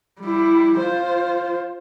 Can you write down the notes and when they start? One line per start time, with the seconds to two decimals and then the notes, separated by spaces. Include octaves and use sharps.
0.20 G3 E4
0.78 F4 C5